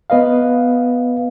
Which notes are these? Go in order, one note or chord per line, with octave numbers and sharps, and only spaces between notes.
B3 B4 D#5 F5